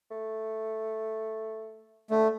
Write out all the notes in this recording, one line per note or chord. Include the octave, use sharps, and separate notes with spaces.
A3
D3 A3